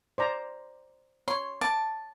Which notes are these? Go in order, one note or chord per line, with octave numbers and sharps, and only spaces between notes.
C5 D5 A#5
C#5 C6
A5 D6